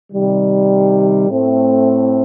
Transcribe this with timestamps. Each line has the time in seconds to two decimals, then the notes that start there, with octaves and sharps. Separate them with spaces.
0.13 C3 D#3 G3
1.28 A2 A3 C4